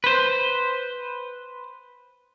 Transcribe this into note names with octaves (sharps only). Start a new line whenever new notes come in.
B4 C5